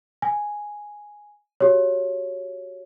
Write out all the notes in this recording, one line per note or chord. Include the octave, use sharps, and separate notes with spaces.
G#5
F#4 G4 C#5